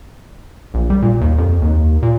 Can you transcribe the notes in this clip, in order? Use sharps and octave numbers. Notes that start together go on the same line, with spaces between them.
A#1
G3
A#2
D#2
F2
D#2
A#2